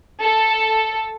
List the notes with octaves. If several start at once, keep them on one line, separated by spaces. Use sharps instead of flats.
A4